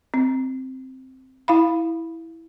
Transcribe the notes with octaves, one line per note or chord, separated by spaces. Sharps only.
C4
E4 F5 B5